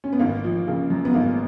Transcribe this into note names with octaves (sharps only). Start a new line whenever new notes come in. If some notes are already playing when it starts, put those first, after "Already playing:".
C#4
B3
G#1 A#3
F3
C#3 A#3
F#2
B3
G#1 A#3